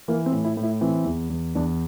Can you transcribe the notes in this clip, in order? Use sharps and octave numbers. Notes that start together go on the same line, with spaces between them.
E3 A#3
C4
A2
E4
A2
E4
E3 C4
E2
E2
E2 D4